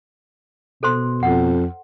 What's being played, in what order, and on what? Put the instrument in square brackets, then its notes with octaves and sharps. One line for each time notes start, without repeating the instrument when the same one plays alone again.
[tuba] B2 [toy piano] A4 C5 C6
[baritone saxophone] F2 [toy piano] F#5